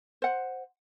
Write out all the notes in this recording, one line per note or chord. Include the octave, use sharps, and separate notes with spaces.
C5 F#5